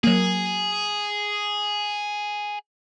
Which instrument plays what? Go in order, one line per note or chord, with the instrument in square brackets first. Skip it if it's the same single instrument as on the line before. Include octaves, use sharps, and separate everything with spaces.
[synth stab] F#3 A#3 [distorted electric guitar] G#4